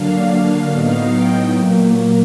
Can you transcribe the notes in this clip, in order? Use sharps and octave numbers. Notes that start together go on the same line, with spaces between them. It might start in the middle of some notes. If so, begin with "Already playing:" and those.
Already playing: D3 F#3 A#3 D4 F5
A2 F#3 B3 D#4
G5
A#2 F#3 A#3